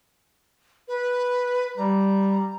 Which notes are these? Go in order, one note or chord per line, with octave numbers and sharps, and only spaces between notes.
B4
G3 A#5